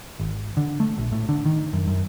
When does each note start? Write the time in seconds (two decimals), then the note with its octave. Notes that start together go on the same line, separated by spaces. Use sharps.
0.20 G#1
0.57 D3
0.80 A3
0.98 A#1
1.12 A2
1.29 D3
1.46 D#3
1.73 F#2
1.87 F#2